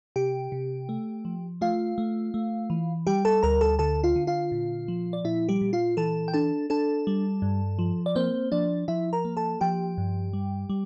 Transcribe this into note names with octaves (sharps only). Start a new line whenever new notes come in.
C3 G4 G5
C3
A3
F3
A3 F4 F5
A3
A3
E3
G3 G4 G5
A4 A5
D2 A#4 A#5
A4 A5
D3 A4 A5
F4 F5
D3
F4 F5
A#2
F3
D5
A#2 E4 E5
G3 G4
A#2
F4 F5
E3 A4 A5
G5
D4 A4 A5
D4 A4 A5
G3
G2
F3
D5
A#3 C4 C5
F3 D4 D5
F3 E4 E5
A#4 A#5
A#3
A4 A5
F3 G4 G5
G2
G3
G3